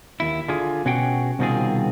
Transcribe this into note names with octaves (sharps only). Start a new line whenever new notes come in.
D#2 E4
D3 F4 G#4
B2 C#4 F#4 G#4 F#5 G5
C2 B2 D#3 C4 F4 G#4